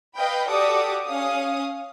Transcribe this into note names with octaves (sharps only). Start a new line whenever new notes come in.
B4 D#5 F5 G5 B5
F#4 G4 A4 D5 D6 D#6
C#4 F5 D#6